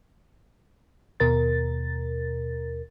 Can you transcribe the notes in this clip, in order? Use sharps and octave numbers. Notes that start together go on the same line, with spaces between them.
D#2 B2 A#4 A6